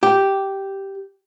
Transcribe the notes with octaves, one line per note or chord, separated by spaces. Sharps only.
G4